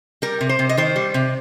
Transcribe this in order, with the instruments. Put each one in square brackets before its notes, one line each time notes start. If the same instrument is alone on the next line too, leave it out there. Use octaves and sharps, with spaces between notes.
[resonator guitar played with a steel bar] G3 A#4
C3
C5
C3
D#5
D#3 C5
G3
C3